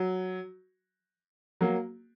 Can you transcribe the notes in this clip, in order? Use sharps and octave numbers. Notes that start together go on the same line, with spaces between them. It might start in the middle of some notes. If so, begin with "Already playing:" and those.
Already playing: F#3
F#3 A#3